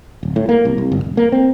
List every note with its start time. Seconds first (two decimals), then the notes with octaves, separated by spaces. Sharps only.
0.23 D1
0.36 A2
0.49 A#3
0.65 C2
0.78 C2
0.92 G1
1.04 E1
1.17 A#3
1.32 C4